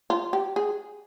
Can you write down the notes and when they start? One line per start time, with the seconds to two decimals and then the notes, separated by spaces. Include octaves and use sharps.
0.10 F4
0.33 G4
0.56 G#4